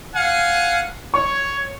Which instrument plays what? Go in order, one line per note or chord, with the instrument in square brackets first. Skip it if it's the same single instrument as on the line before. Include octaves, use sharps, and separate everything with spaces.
[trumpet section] F5 F#5 G#5
[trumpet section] C#5 [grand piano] C#6